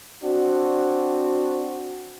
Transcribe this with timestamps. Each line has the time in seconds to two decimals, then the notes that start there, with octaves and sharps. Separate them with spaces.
0.23 C4 D4 F#4